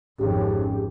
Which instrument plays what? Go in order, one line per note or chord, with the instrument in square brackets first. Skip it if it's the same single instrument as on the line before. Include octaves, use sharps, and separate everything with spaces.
[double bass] G#1 F2 [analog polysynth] C#4 G4 G#4